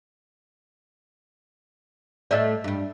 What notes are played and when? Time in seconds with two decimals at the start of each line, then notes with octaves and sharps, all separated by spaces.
2.31 A2 A3 A4 D5 D#5
2.64 G2 G3